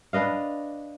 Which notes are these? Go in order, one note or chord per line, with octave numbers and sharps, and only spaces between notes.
D4 B4 D#5 F5